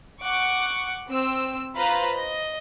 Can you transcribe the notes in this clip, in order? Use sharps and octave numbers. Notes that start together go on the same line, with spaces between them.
F#5 C#6 D6
C4 E6
F4 B4 C5 F5 A#5 B5
D#5